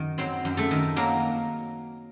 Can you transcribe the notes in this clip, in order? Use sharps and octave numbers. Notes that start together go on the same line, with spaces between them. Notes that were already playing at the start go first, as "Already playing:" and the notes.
Already playing: F#2 D#3
F#3 C4 C5
F#2
A3 A4
D#3
F#3 A#3 A#4